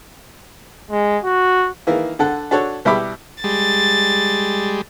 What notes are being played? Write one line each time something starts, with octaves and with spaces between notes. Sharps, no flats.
G#3
F#4
D#3 E3 A#3
D3 A4 F#5
D4 F#4 A4 C#5
B2 G3 E4 E5 B5 D6
G3 G#3 A6